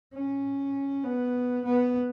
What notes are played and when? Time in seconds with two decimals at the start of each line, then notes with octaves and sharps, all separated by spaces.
0.13 C#4
1.04 B3
1.65 B3